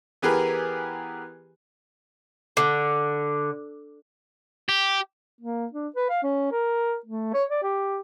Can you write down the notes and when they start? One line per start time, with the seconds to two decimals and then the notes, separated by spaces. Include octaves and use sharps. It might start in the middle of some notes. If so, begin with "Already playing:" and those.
0.22 E3 B3 G4 G#4 A#4 B4
2.57 D3
4.69 G4
5.41 A#3
5.73 D4
5.96 B4
6.10 F5
6.23 C#4
6.51 A#4
7.06 A3
7.34 C#5
7.50 D5
7.63 G4